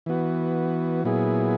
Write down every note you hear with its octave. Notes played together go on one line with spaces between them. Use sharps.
E3 B3 F#4
A#2 F#3 B3 E4 G#4